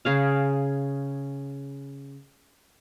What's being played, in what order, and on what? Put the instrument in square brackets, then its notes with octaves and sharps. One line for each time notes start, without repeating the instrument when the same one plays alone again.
[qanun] C#3 G#4 F5